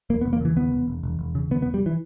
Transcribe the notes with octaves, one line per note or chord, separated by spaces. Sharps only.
E1 A#3
B3
E1
A#3
C#3 E3
D#2 B3
E1
E1
E1
E1
C#3
D#2 B3
B3
E1
G3
E3